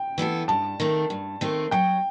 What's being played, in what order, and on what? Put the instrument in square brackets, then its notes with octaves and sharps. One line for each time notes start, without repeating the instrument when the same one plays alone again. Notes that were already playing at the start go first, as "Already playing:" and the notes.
Already playing: [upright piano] G5
[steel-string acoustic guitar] E3 B3 F#4 A4
[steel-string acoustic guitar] G2 [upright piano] A5
[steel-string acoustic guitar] D#3 A3 C4
G2
D#3 A3 C4
[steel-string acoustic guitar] F#3 [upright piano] G5